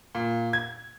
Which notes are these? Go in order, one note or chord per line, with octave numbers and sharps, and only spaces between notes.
A#2
G#6